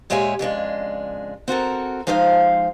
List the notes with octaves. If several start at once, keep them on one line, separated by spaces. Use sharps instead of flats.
A#2 G#3 G4 C#5 E5 G#5
F2 C#3 G#3 D4
C4 F#4 A4 A#4
F3 G#3 D#4 C5 D5 F5